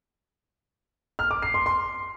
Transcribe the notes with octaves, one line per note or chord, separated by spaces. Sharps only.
F6
D6
C7
C6
C6